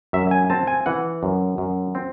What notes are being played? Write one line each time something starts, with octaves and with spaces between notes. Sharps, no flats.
F#2 E5
G#5
C4 A5
G#5
E3 F#5
F#2
F#2
C4